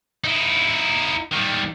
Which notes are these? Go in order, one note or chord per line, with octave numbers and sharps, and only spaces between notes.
D#4 E4
D#3 G3